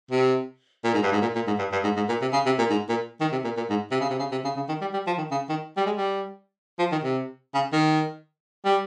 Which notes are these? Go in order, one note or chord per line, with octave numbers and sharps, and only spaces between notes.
C3
A#2
G#2
G2
G#2
A#2
A#2
G#2
G2
G2
G#2
G#2
A#2
C3
C#3
C3
A#2
G#2
A#2
D#3
C3
A#2
A#2
G#2
C3
C#3
C3
C#3
C3
C#3
C#3
D#3
G3
G3
F3
D#3
C#3
D#3
G3
G#3
G3
F3
D#3
C3
C#3
D#3
G3